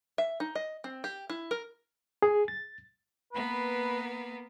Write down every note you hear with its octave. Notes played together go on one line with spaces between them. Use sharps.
E5
D#4
D#5
C4
G4
E4
A#4
G#4
A6
A#3 B3 B4